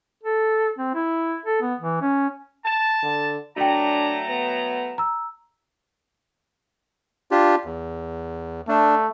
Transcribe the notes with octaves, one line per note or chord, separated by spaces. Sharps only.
A4
C4
E4
A4
B3
E3
C#4
A5
D3
F#3 A3 D4 F#4 G5 A#5
B3
A#5 E6
D4 F4 G4
E2
A3 D4